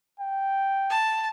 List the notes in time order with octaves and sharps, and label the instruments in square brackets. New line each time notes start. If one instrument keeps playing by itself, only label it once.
[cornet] G5
[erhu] A5